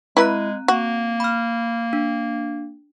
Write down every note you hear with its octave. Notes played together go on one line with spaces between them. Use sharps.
G#3 C4 E4 B4 A#5 F#6
A#3 F#4
B5 F6
D4